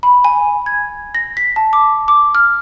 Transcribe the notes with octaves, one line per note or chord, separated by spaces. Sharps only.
B5
G#5
G#6
A#6
B6
A5
D6
D6
F6